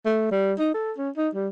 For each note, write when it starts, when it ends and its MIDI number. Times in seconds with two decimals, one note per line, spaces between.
0.05 0.28 57
0.31 0.53 55
0.59 0.72 63
0.74 0.92 69
0.97 1.10 61
1.17 1.29 63
1.34 1.49 55